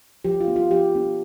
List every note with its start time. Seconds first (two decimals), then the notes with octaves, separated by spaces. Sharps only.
0.25 F3 G4
0.40 F4
0.47 B3 D4
0.56 F4
0.70 F3 G4
0.95 B3 D4